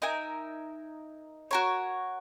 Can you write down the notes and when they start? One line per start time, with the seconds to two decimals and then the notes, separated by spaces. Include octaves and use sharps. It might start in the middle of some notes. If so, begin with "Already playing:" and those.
0.02 D#4 A#4 E5 G#5
1.51 F#4 A#4 C#5